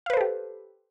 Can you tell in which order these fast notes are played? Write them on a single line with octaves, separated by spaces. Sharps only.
F5 B4 C5 A4 G4